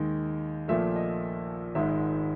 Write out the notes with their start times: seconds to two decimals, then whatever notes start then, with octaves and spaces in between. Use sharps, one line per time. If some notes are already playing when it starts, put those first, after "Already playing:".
Already playing: D#2 D#3 G#3
0.68 A#1 A#2 F3 A3 E5
0.96 D#5
1.75 G#1 G#2 D#3 G#3 E5